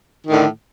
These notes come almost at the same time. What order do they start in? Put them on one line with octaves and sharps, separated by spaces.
D#3 A2 D3